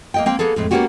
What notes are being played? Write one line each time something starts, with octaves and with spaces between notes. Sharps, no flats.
A#3 D#5 G5
A#3 C4 G5
A#3 B3 G#4 A4
F2 A2 G#3
A#3 B3 C#4 D#4 F#4 G4